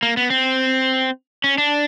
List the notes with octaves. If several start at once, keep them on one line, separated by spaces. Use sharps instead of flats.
A#3
B3
C4
C#4
D4